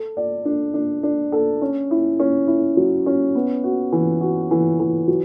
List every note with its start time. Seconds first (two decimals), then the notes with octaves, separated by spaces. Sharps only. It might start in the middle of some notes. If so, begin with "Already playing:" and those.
Already playing: A4
0.17 D5
0.45 D4
0.74 D4
1.03 D4
1.32 A4
1.62 C#4
1.91 E4
2.20 C#4
2.47 E4
2.77 F#3
3.06 C#4
3.35 B3
3.64 F#4
3.92 E3
4.21 F#4
4.51 E3
4.80 E3
5.08 F#3